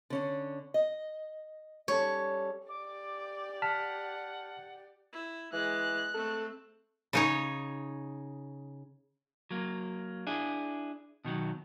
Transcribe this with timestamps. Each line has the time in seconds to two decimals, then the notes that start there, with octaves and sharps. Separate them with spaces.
0.10 D3 C#4 D4
0.74 D#5
1.88 G3 C#4 A4 C#5
2.69 G4 D5 D6
3.62 F#5 A5 F6 B6
5.13 E4
5.53 E3 G#3 F#6
6.14 A3 C4 A4
7.13 C#3 D#4 C#5
9.51 F#3 A#3
10.27 D4 E4 G#4
11.25 B2 D#3 F#3